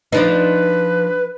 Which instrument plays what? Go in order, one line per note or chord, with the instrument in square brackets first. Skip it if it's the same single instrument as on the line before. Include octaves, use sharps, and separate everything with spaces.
[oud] F3 D4 D#4 [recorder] B4